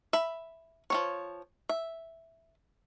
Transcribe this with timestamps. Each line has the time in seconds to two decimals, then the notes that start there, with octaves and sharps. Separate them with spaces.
0.13 E5 B5
0.90 F3 C4 C#5
1.69 E5